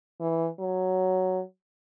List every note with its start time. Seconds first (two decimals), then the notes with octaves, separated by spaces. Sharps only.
0.21 E3
0.59 F#3